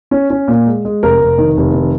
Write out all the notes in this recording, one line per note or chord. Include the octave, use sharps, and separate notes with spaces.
C#4
C#4
A#2
G#3
G#3
F1 A#4
F1
D#3
F1
D#3